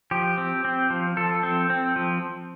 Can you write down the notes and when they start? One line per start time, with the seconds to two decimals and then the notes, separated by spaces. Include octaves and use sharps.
0.11 F3 G4
0.38 C4
0.65 C4
0.90 F3
1.17 F3 A4
1.43 C4
1.70 C4
1.96 F3